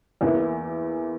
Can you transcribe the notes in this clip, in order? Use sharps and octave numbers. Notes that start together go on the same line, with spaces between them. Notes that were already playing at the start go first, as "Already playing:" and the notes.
E2 E3 A#3 E4